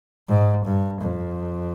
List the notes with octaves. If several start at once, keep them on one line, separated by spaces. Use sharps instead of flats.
G#2
G2
F2